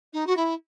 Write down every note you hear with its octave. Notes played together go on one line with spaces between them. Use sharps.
D#4
F#4
E4